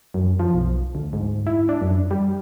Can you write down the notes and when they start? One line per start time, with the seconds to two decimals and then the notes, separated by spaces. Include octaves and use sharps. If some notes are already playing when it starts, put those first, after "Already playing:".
0.14 F#2
0.40 F3
0.54 B1
0.95 D2
1.13 G#2
1.47 E4
1.69 D4
1.81 F#2
2.11 G3